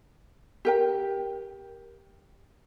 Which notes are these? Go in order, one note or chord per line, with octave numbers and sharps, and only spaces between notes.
G4 A#4 G5